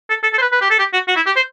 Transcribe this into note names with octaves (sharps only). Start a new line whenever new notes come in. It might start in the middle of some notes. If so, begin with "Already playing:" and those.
A4
A4
A4
C5
B4
B4
G4
A4
G4
F#4
F#4
E4
G4
C5